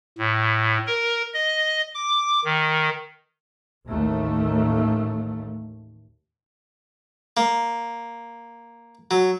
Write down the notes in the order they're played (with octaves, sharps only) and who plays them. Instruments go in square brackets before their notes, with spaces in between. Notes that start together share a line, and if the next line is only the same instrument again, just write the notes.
[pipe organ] A2
A#4
D#5
D6
D#3
[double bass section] A1 D#2 A3
[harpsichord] A#3
F#3